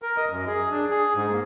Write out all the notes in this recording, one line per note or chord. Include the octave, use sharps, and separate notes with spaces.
A#4
D#5
F#2
G#4
D4
G#4
G#2
A#3